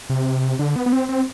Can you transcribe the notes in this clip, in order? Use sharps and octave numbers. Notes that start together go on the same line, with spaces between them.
C3
D3
B3
B3
C4
C4